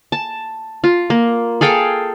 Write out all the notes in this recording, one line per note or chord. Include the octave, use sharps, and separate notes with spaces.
A5
F4
A#3
G#4 A4 F5 G5